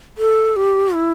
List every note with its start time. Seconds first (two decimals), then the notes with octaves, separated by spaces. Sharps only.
0.18 A4
0.56 G4
0.94 E4